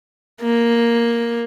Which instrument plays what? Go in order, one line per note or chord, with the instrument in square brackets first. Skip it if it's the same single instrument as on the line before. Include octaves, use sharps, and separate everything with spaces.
[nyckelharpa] A#3